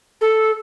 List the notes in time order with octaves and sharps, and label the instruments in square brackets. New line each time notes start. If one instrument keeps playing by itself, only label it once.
[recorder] A4